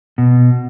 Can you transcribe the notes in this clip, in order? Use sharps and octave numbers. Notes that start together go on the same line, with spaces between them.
B2